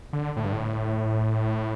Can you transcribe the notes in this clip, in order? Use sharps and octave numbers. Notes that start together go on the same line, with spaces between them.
D3
A2
G2
A2